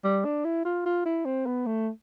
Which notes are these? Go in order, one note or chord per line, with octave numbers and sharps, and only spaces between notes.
G3
D4
E4
F4
F4
E4
C4
B3
A3